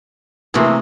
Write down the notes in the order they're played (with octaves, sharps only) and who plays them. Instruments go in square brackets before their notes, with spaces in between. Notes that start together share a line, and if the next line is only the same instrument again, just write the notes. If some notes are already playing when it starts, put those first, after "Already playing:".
[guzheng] C3 G#4 [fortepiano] E3 A3 A#3